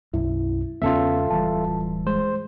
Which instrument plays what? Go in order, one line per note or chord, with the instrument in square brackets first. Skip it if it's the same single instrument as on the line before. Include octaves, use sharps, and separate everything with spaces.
[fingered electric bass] B1 F#2 [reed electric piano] E4
[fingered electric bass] E2 C#3 G#3 [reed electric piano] B3 C#4 [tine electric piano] F4 A4 E5
[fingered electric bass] D1 E3 G3 [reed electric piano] A5
[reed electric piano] G#3 [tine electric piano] C5